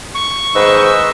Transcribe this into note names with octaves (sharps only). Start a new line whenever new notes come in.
C#6
G#2 D#3 B4 C5 D#5 E6